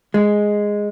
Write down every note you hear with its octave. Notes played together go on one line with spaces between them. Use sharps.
G#3